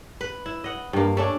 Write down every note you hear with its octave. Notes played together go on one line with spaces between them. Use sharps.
B4
E4
D#5 F#5
G2 A#3
A3 C#4 D4